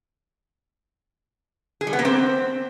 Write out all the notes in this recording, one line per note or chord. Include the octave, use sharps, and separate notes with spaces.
G#4
G3
B3
A#3
C4